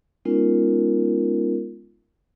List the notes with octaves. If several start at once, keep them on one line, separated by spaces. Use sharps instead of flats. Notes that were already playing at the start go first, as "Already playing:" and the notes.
G#3 B3 C#4 D#4 F4 A#4